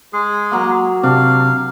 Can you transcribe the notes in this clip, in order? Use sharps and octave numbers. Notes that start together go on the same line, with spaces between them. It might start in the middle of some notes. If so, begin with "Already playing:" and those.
G#3 G#4
F#3 A#3
C3 C4 D4 F5